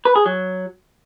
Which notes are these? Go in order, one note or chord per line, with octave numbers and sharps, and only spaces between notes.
B4
G#4
F#3